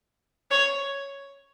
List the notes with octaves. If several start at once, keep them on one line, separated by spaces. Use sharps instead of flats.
C#5